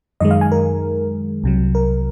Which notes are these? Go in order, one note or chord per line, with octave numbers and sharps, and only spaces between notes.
F#2 D#3 G#3 D#5
F5
G#5
A#4
C2 C3 F#3
A#4